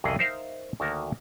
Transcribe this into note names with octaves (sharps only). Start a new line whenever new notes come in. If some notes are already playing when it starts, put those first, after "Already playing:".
C2 F2 C#3 E3 G#4 D#5
D#4 A#4 C5 E5 F5
D2 D#3 A#3 F#4 A#4 A5